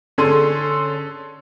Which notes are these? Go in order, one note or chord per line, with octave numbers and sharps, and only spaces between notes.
D3 C#4 G#4 A4 C6 D#7